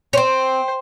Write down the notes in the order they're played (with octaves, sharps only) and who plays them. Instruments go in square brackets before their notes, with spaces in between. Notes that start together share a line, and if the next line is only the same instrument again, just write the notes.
[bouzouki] C4 C#4 [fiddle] C5